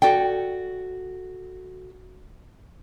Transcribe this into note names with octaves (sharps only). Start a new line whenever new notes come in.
F#4 A4 D5 G5